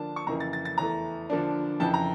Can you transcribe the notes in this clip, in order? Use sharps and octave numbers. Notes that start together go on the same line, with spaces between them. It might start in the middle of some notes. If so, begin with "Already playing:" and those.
Already playing: D3 F3 A#3 D4 A5
C#6
F2 C#3 E3 A#3 A#5
A6
A6
A6
E2 E3 A3 A#5
D3 F3 A#3 D4
F2 C#3 E3 A5
A#5